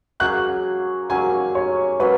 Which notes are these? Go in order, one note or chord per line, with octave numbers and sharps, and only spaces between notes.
F#3 A#3 C#4 G#4 F#6
F#3 A#3 C#4 G#4 G#5
C#5
F#3 A#3 C#4 B4